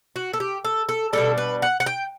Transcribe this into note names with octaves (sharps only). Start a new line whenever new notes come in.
F#4
A4
G4
A4
A4
B2 G3 D4 A4
B4
F#5
F#5
G5